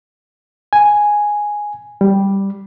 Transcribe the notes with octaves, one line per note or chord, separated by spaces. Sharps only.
G#5
G3